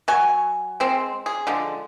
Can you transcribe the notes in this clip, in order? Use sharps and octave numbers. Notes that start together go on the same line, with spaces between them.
F#3 G#5 C#6
G#3 C4
G#4
D3 F3 G#3